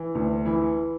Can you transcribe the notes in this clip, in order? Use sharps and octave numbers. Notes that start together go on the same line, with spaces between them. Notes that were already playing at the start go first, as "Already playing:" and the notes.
Already playing: E3
D2
E3 E4